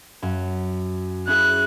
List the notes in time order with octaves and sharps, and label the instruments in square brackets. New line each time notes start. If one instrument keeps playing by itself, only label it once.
[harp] F#2
[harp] C#4 E4 G#4 [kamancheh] F#6